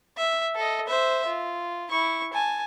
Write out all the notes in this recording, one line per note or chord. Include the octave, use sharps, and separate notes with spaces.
E5
A4 D#5
C5 E5
F4
E4 C#6
G#5 A5